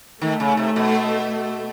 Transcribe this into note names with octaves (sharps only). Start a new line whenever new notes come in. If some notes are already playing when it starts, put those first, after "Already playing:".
D#3 A3
C#3
C3
B2